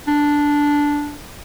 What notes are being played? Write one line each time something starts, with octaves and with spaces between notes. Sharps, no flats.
D4